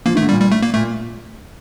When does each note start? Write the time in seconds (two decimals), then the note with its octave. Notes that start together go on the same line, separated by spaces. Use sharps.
0.06 F3 A#3
0.15 D#3 A3
0.22 D3
0.29 G3
0.31 A#2
0.40 G3
0.51 A3
0.62 A#3
0.74 A#2 A3